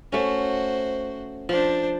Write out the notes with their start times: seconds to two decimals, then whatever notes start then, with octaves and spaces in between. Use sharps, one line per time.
0.12 A3 C#4 F#4 C5
1.49 F3 D4 C5